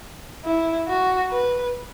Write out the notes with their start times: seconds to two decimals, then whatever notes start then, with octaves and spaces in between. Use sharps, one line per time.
0.45 E4
0.88 F#4
1.31 B4